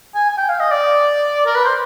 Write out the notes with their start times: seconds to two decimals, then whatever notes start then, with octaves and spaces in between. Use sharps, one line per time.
0.14 G#5
0.29 G#5
0.37 G5
0.49 F5
0.60 D#5
0.71 D5
1.46 A#4
1.55 B4
1.64 C5